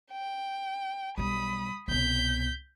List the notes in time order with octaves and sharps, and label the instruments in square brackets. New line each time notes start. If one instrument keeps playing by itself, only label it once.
[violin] G5
[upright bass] B1 G3 [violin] B5 D#6
[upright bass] C2 B2 [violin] G6 B6